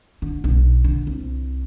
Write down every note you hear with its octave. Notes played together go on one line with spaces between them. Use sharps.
D3
B1
D3
C2